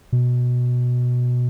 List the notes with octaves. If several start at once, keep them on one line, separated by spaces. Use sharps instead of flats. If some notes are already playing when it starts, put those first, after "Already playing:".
B2